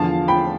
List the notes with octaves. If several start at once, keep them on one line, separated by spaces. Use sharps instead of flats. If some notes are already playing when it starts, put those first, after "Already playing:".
Already playing: E2 D3 F3 F5 A5
G5 B5